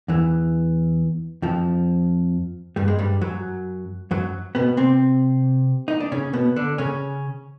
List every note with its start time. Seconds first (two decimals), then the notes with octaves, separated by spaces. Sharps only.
0.08 E2 E3
1.42 F2 F3
2.76 G2 G3
2.88 G#3
2.99 G2 G3
3.21 F#2 F#3
4.11 F#2 F#3
4.55 B2 B3
4.77 C3 C4
5.88 D#4
6.00 D4
6.12 C#3 C#4
6.33 B2 B3
6.56 D3 D4
6.78 C#3 C#4